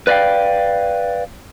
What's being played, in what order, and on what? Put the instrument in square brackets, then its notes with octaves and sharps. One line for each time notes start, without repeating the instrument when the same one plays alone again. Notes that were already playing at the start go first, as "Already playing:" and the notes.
[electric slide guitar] B4 D5 D#5 F5 G5